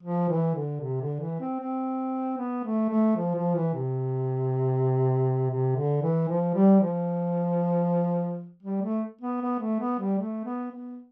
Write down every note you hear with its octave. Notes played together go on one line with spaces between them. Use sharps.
F3
E3
D3
C3
D3
E3
C4
C4
B3
A3
A3
F3
F3
E3
C3
C3
D3
E3
F3
G3
F3
G3
A3
B3
B3
A3
B3
G3
A3
B3
B3